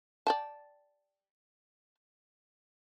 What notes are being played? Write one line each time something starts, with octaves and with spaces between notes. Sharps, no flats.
D5 G5 A5